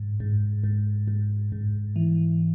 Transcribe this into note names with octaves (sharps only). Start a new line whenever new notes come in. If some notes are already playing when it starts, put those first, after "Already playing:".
Already playing: G#2
G#2
G#2
G#2
G#2
E3